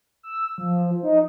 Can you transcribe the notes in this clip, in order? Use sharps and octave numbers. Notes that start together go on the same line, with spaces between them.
E6
F3
D#4